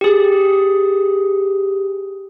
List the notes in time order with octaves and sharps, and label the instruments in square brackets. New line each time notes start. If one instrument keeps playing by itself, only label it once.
[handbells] G4 G#4